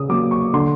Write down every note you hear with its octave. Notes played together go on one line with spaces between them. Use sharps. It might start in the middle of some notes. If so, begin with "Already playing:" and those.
Already playing: C#3 D#6
F#3 A#3 D6
C#6
D3 C6